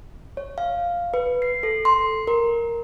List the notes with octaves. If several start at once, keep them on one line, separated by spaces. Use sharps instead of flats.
C#5
F5
B4
C7
A4
C6
A#4